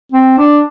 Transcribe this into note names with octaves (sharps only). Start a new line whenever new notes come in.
C4
D4